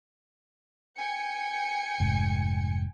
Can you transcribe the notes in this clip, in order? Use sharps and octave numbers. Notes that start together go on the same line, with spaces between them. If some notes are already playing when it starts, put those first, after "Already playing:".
G5 G#5 C#7
F1 G#2